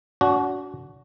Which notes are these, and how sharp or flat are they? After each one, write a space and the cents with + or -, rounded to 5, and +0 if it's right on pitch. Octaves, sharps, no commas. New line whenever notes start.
D4 -40 F#4 +0